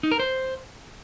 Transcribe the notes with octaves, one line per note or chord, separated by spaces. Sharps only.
D#4
A#4
C5